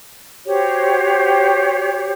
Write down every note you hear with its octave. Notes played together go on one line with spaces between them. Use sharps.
F#4 G4 C5 C#5